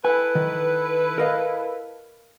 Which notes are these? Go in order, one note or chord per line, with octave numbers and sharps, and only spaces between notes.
E4 A4 B4 G#5
D#3
A#4 D#5 F5